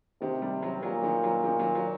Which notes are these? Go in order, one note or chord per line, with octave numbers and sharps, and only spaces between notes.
C3 D#3
G3
F#3
A#2 F#3
D#3
F#3
D#3
F#3
F#3